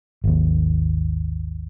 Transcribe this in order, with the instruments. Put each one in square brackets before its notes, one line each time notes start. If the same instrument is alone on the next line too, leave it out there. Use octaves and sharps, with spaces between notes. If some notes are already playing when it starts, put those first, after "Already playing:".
[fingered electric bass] G#1 D#2